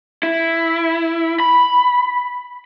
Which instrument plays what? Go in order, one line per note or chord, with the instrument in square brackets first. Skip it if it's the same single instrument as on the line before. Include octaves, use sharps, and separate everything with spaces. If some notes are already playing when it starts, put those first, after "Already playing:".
[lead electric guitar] E4
B5